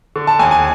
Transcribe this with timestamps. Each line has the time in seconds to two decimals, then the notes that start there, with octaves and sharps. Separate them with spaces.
0.16 D3
0.27 A5
0.39 D#2 G#5
0.51 G#5